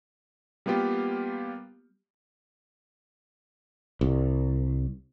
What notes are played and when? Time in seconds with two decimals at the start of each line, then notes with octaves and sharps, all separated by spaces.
0.66 G3 A#3 B3 F4 G4
4.01 C2